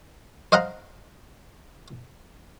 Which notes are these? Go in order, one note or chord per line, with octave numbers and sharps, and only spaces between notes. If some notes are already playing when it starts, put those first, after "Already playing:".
C5 D#5 F5 F#5 A#5